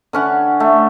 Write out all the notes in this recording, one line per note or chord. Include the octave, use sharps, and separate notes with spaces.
D3 C#4 F#5
A3